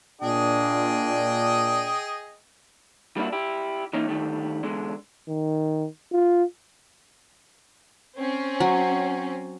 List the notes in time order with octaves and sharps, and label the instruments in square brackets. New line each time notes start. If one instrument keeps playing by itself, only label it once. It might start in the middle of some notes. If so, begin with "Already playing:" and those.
[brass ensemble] A#2 D4 [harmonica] G#4 D#5 G5
[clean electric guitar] G3 A#3 D4 E4 F#4
E4 G4
E3 A#3 C#4 D#4
D3 D#3 G3 A3
E2 D3 G#3
[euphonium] D#3
F4
[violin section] C4 C#4
[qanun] F#3